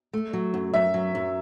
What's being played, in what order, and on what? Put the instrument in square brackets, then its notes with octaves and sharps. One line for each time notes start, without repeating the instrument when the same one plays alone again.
[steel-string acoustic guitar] A3
F#3
F#2
[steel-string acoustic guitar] F#2 [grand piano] E5
[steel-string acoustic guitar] F#3
F#2